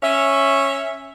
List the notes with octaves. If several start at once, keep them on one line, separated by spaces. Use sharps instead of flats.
C#4 E5